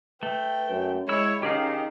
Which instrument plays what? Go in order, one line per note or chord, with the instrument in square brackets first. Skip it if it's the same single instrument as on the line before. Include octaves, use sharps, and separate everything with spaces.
[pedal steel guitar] A3 [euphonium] B4 [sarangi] G5
[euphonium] F#2
[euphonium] G#3 [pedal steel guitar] E4 E6 [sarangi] C#5
[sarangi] D#3 [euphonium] C#4 [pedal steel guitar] G4 G#4 F5